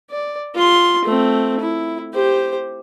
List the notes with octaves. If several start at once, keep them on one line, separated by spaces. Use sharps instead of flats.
D5
F4 C6
A3 C4
E4
G4 C5